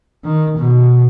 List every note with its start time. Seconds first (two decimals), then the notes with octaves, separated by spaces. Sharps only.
0.25 D#3
0.58 B2